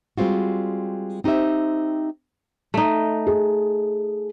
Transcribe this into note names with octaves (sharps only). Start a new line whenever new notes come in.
G3 G#3 C4 F4 F#4
C4 D#4 G4 C5 E5
A3 D#4
G#4